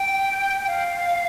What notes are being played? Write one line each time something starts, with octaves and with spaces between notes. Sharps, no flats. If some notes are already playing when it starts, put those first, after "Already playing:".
Already playing: G5
F5